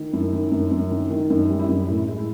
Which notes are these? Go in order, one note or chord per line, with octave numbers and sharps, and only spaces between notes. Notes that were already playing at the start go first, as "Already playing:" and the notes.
Already playing: D#3
F#2 E4
D#3
F#2
F#2
D#3
D#3
F#2 D#4
G3
E4
F#2
A2 E4
G#3
E4